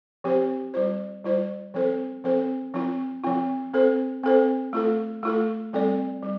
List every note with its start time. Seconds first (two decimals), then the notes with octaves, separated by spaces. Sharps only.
0.24 F3 C4 G4 C5
0.74 G3 F4 C5
1.24 G3 F4 C5
1.74 F3 C4 A4 C5
2.24 F3 C4 A4 C5
2.74 F3 C4 F4
3.24 F3 C4 F4
3.74 C4 A4 C5
4.23 C4 A4 C5
4.73 A3 F4 A4
5.23 A3 F4 A4
5.73 G3 C4 A4 D5
6.22 G3